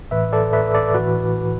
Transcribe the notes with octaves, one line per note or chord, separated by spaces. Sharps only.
A2 E3 B4 E5
A4 D5
B4 E5
A4 D5
A2 E3 F#4 B4